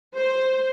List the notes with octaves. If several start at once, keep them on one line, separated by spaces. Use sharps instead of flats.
C5